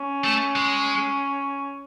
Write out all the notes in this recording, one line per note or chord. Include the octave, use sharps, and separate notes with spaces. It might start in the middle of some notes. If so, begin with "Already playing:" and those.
Already playing: C#4
A3
G#3